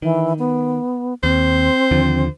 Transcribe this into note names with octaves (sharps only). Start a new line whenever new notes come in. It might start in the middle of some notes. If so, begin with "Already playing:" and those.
D#3 E3
B3
D#2 C4 C5
D#2 D3 F3